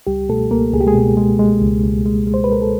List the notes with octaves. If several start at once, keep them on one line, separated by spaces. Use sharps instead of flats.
C#2 G3 G4
B2 A3 A4
C#2 A#3 A#4
C#2 G#4
G4
G#3 G#4
B2
G#3
G#3
C#2
C#2
G#3
G#3
C5
B4
G#3 A#4
A4